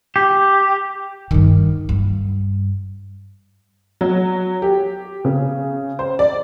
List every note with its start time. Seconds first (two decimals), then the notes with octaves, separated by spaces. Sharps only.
0.16 G4
1.31 G2 D#3
1.89 G2
4.01 F#3
4.62 G4
5.25 C#3
5.99 C5
6.19 D5